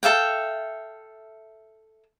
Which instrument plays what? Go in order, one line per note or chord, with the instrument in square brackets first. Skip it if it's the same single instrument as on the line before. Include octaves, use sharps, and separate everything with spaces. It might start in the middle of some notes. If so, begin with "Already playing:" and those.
[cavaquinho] A4 E5 F5 G5